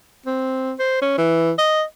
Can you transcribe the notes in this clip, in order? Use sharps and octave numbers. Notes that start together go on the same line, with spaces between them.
C4
C5
C#4
E3
D#5